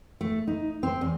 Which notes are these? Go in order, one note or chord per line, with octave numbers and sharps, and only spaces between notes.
A3
D#4
C4
E2